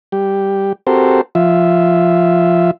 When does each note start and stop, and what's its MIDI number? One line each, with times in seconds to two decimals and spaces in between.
0.12 0.73 55
0.12 0.73 67
0.87 1.21 60
0.87 1.21 66
0.87 1.21 67
0.87 1.21 69
0.87 1.21 70
0.87 1.21 72
1.35 2.71 53
1.35 2.71 65
1.35 2.71 76